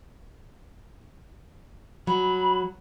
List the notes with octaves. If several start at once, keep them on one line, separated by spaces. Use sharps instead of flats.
F#3 B5